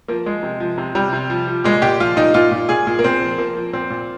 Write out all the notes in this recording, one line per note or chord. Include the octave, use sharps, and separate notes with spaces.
F3 A#3
F3 G#3
C3
F3
C3
C3 G3
C3
F3
F3
A#2 G#3
A#2 G4
F3 F4
A#2 D#4
A#2 F4
A#2
A#2 G#4
A#2
A#3
A#2 C4
F3
F3 A#3
F3
A#2 C4
A#2